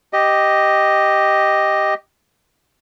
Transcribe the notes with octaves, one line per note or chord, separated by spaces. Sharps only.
G4 D#5